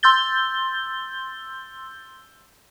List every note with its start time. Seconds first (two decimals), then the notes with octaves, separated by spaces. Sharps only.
0.03 C6 E6 G6 A6 G7